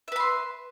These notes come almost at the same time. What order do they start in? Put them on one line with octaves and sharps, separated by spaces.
E5 B4 B5 C6